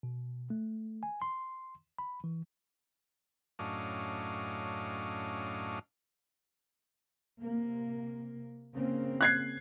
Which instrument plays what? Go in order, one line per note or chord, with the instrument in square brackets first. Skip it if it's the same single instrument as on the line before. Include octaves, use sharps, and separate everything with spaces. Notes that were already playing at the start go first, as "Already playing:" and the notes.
[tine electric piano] B2
A3
G#5
C6
B5
E3
[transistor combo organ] F#2 A2 C#4 D4 D#5 F5
[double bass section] C3 A#3
C#3 A#3 C4
[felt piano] F#6 G#6 C7